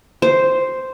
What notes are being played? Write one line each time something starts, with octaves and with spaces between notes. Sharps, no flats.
C5